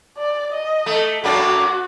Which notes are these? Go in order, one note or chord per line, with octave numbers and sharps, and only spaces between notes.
D5
D#5
A3
F#2 A#3 F#4 D5